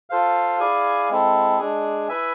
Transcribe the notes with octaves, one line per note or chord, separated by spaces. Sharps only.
F4 A4 C5 F5
E4 G#4 D5 F5 G#5
G#3 C4 E4 A4
G#3 D4 G#4
E4 B4 E5 G#5